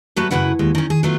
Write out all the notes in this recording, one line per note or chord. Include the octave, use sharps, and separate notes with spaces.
G2 F#3 A3 F#4 B4 F#5
F#2 C#3 E4 B4 F#5
D#2 G#3
D#3 C#4
G#4
F#3 A3 B3 F4